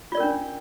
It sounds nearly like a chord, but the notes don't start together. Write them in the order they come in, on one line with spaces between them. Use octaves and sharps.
F4 D5 A#4 C#4 D4